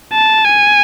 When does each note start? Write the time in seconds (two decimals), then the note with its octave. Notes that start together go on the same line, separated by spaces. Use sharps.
0.13 A5
0.45 G#5